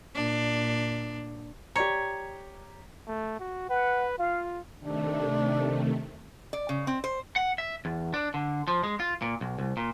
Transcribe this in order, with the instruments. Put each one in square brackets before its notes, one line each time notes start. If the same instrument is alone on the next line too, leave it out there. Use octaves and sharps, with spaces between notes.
[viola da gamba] A#2 D4
[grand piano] G4 D5 A#5 [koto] C#5
[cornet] A3
F#4
[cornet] B4 [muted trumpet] F#5
[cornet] F4 [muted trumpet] F5
[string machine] C3 D#3 A3 [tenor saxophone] D4
[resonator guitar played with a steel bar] D5
C#3
C4
C5
[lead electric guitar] F#5
E5
E2
D4
D3
F3
G#3
F4
A#2
B1
C2
A#2